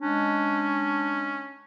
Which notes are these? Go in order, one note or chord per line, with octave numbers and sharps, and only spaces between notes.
G#3 C#4 D4